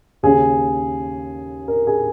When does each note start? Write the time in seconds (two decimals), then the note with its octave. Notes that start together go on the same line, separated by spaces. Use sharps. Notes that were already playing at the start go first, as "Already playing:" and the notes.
0.23 D#2 C#3 G#4
1.68 A#4
1.87 G#4